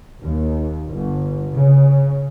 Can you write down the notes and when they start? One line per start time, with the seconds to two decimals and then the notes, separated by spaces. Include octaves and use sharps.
0.21 D#2
0.92 G1
1.54 C#3